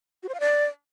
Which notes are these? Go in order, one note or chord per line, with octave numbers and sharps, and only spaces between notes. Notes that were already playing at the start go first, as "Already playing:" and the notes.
F#4
C5
F5
D5